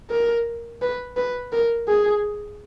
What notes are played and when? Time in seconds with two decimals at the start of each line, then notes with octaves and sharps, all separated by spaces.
0.10 A#4
0.81 B4
1.17 B4
1.52 A#4
1.88 G#4